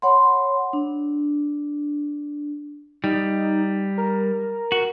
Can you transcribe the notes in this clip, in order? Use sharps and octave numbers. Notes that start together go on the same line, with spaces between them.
C#5 F#5 B5 C6
D4
G3 D#4
A#4
F#4